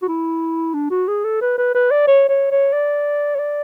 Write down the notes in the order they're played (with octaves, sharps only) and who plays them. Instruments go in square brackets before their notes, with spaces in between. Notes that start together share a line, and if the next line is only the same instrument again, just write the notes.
[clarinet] F#4
E4
D4
F#4
G#4
A4
B4
B4
B4
D5
C#5
C#5
C#5
D5
C#5
D5